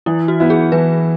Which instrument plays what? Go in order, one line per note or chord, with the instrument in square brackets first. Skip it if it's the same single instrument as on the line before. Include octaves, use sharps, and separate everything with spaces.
[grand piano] E3 [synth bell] E4
[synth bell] F#4
[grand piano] B3 E4
[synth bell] G#4
[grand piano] E3 [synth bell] B4